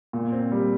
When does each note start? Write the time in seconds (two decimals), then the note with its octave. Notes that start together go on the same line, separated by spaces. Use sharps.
0.13 A#2
0.32 C4
0.51 G3